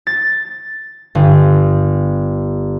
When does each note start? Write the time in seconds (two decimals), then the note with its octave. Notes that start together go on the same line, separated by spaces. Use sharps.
0.07 A6
1.15 G1